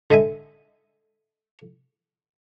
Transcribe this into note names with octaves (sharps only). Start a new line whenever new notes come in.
D3 D#5 E5 G#5